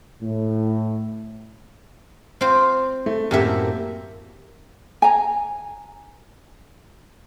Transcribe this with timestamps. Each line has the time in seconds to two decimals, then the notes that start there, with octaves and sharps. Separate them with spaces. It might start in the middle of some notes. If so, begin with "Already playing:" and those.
0.22 A2
2.41 C4 F4 C5
3.06 A3
3.31 F#2 A2 A#3 C4 G4 E5
5.02 G#5 A#5